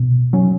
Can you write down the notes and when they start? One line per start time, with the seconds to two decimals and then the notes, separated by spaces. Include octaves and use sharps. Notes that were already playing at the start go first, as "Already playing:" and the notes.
Already playing: B2
0.33 F#3 C#4